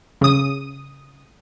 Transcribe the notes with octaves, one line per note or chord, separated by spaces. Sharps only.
C#3 D#6